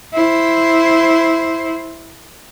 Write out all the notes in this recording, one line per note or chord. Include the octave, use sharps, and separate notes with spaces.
E4 C5